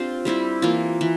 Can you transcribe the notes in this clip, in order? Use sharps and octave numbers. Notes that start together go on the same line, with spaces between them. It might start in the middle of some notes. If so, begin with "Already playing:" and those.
Already playing: C4 D4 F4 G4 C5
G3 C4 E4 G4
E3 A#3 F4
E3